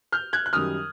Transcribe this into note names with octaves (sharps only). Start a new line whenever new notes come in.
F6 G6
F#6 G#6
F#6
F#2 D#3 G3 D#6 F6